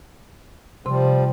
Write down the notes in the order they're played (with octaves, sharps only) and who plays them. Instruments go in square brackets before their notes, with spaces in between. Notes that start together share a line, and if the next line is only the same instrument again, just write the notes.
[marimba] C3 C6 [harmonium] F3 G3